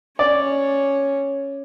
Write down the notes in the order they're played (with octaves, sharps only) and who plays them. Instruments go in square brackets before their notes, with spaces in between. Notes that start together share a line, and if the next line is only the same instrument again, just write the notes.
[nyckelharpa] C#4 C#5 [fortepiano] D5